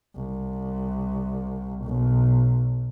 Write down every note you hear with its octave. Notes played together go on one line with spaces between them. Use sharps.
C2
B1